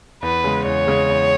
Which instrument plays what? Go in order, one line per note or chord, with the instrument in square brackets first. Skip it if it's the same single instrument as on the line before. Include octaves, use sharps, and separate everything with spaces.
[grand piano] E2 [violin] B4
[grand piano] C#3 G#3
[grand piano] E2 [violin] C#5
[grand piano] C#3 G#3
E2